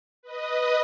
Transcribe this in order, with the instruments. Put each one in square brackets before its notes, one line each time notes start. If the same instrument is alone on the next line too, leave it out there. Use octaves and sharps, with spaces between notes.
[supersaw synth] B4 D#5 D#6